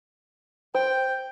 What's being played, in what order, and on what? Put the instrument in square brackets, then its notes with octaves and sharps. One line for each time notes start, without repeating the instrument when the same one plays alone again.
[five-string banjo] C5 [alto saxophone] G5